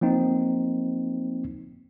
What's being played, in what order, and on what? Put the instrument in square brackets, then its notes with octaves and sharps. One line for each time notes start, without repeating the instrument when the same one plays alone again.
[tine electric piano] F3 A#3 C4 D#4